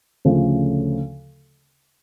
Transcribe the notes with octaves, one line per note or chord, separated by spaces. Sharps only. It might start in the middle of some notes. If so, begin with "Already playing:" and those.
D2 C#3 F3 A3 C#4